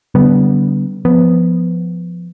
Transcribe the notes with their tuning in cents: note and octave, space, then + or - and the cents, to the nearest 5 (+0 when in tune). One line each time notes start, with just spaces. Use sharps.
D3 -30 G3 -30 B3 -5
F3 +0 B3 +0